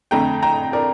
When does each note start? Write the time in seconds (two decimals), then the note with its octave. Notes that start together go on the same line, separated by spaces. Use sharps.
0.11 F2 D3 A3 G5 A#5
0.43 G5 A#5
0.73 A#4 D5